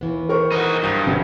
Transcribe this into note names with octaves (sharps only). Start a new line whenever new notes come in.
D#2 E3 B3
A#4 C5 C#6
D#4 F#4
G2 D#6
G1 B3